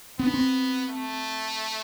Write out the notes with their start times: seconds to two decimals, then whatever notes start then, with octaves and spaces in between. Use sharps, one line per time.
0.19 B3 C4
0.27 D4
0.34 C4
0.90 A3